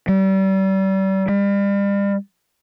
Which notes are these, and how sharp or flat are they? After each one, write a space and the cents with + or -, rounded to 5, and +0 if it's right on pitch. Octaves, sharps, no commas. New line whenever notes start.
G3 -30
G3 +35